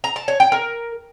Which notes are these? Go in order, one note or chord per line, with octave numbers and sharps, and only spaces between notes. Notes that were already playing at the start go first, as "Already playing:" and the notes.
A#5
A5
C#5
G5
A#4